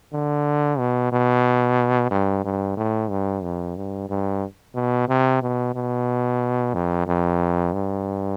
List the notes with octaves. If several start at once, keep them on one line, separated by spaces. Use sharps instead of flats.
D3
B2
B2
G2
G2
A2
G2
F2
G2
G2
B2
C3
B2
B2
F2
F2
G2